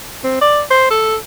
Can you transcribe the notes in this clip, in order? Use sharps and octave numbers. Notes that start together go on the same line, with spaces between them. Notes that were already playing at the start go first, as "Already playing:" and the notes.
C4
D5
C5
A4